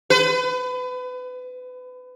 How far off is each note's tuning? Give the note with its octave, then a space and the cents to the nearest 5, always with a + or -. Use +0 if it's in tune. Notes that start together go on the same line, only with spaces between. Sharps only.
B4 +30